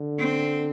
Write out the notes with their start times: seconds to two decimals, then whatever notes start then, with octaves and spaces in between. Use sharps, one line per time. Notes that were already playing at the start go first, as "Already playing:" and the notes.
Already playing: D3
0.19 C4